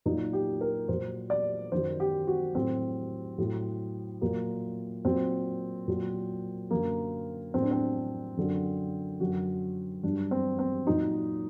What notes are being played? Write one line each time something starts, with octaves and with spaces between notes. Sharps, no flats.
A#2 F#3 D#4
G4
A#4
A#2 F#3 C5
D5
F#2 D#3 F#3 C5
G4
F#4
A2 F#3 C4
A2 F#3
A#2 F#3 A#3
A#2 F#3 C4
A#2 F#3
F#2 D3 F#3 A#3
A2 F#3 C4
D4
C4
F#2 D3 F#3
F#2 D3 F#3 F#4
G2 F#3 D4
C4
C4
A#2 F#3 D#4